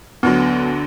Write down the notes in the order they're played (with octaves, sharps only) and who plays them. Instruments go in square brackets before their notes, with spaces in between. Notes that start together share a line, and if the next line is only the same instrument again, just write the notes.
[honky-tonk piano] D2 D3 F#3 [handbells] B3